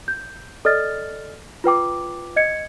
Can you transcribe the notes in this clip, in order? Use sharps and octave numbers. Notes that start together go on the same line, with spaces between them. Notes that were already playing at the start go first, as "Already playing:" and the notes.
G6
A4 D5 D#5 F6 A6
F4 B4 G5 D6
D#5 G#6 C#7